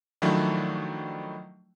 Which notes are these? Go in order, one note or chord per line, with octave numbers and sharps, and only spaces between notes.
D#3 F3 F#3 A3 D4 E4